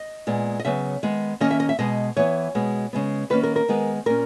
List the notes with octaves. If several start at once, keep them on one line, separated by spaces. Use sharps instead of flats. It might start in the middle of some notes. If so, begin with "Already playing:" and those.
Already playing: D#5
A#2 G#3 B3
D#5
C#3 F#3 B3 E5
D#3 G#3 B3
D#3 A#3 C#4 D#5
E5
D#5
E5
B2 G#3 B3 D#5
E3 B3 C#5
B2 G#3 B3
C#3 G#3 B3
D#3 A#3 C#4 B4
A#4
A#4
D#3 G#3 B3
A#2 A#3 C#4 A#4